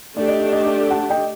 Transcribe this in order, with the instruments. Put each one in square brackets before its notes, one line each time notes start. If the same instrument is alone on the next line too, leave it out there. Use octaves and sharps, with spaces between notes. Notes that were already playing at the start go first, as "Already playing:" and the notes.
[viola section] A3 D4 G4 [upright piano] D5
[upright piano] D#5
D5
D#5
D5
F#5 A5
D#5 G5